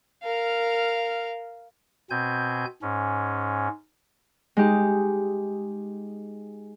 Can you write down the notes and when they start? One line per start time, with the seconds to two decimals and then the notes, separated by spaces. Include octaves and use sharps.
0.23 A#4 F5
2.10 B2 C4 G#5 G6
2.82 G#2 C#4
4.57 G#3 D#4 G4